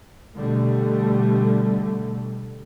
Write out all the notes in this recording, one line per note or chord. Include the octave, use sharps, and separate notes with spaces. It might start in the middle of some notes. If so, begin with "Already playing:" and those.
B2 D3 G3 A3